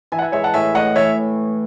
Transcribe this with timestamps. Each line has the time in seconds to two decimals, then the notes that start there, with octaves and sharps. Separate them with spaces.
0.12 E3 E5 G#5
0.19 F#5
0.22 E5 G#5
0.32 G#3 C#5 E5
0.44 F#5 A5
0.54 A2 E5 G#5
0.75 A2 D#5 F#5
0.96 E3 C#5 E5